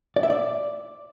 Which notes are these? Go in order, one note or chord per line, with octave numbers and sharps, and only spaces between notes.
D5
E5
D5